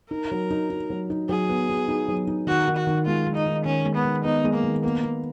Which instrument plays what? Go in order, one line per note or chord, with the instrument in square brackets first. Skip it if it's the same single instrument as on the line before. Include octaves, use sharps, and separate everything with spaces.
[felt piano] D#4 [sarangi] A#4
[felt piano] F#3
D#4
D#4
F#3
D#4
[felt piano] F#3 [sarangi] G#4
[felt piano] B3
B3
D#4
F#3
D#4
[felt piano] D#3 [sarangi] F#4
[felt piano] D#3
[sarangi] F#4
[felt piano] D#3
[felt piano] G#3 [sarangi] F4
[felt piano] D#3
[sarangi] D#4
[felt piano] D#3
[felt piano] D#3 [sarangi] C#4
[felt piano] G#3
[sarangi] B3
[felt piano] D#3
[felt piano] B3 [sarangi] D#4
[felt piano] G#3
[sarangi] A#3
[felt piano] D#3
[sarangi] A#3 [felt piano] B3
[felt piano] B3